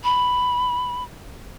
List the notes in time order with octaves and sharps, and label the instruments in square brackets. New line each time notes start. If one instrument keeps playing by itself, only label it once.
[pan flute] B5